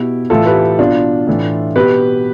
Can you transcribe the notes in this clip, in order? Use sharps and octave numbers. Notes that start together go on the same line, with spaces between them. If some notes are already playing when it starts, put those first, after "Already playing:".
Already playing: B2 E4 G4
A2 E3 F4 A4
G4 B4
B2 D4 F4
A2 E3
B2 G4 B4